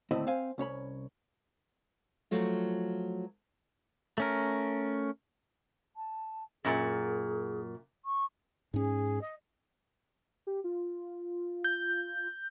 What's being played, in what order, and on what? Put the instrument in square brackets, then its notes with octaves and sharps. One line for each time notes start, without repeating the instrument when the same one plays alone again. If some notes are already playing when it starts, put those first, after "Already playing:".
[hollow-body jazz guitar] D#2 A2 D3 C4 E4 D#5
C4 C5 F5 G#5
C2 C#4 C#5 B5
[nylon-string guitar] F3 F#3 A3 F4
[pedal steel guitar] A3 C#4 A#4
[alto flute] A5
[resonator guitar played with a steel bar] F#2 A#2 [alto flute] G#4
[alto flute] C#6
[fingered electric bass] G#2 C#4 [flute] G#4
[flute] D#5
[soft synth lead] G4
F4
[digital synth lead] G6